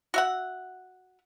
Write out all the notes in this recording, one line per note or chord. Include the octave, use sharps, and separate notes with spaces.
F#4 E5 F#5